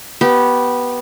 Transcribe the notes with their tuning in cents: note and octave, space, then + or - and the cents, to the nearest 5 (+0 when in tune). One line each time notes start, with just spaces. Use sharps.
B3 -10 G4 -25